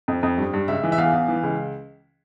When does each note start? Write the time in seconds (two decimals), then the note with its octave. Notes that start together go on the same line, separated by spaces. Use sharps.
0.08 F2
0.23 F2
0.38 G2
0.53 G2
0.68 C#2 E5
0.83 E3
0.92 E5
0.98 E2 F5
1.13 E2
1.28 E3
1.43 C#2